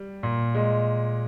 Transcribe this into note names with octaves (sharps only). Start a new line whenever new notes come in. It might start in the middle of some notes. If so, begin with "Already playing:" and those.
Already playing: G3
A#2
G#3